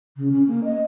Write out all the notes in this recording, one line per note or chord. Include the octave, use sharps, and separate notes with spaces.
C#3
C#4
A#3
D#5